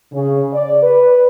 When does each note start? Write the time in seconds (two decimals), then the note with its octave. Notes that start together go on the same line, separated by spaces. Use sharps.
0.13 C#3
0.53 D5
0.83 B4